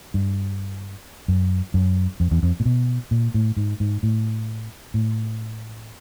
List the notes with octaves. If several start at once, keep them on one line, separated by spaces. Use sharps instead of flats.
G2
F#2
F#2
F2
E2
F2
A#2
B2
A#2
A2
G#2
G#2
A2
A2